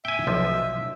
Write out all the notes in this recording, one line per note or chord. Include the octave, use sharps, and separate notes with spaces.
E5 G5 G#5
B1 F3